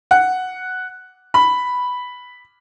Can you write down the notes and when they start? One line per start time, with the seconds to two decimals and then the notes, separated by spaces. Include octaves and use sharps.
0.11 F#5
1.34 B5